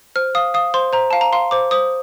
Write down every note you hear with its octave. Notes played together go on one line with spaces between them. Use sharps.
C5 F6
F5 D#6
F5 D#6
C5 C6
C5 A#5
F5 A5
A#5
F5 C6
C5 D6
C5 D#6